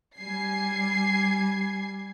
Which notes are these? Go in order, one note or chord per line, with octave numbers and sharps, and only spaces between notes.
G3 G#5 G#6 C7